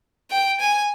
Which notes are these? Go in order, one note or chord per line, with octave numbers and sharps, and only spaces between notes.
G5
G#5